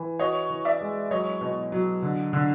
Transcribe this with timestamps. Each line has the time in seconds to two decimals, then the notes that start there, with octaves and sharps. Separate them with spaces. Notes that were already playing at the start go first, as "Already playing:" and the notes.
Already playing: E3
0.19 F#4 C#5 D#5
0.50 E3
0.65 D5 E5
0.81 G#3
1.11 F#3 C#5 D#5
1.41 B2
1.72 F#3
2.03 D3
2.33 D3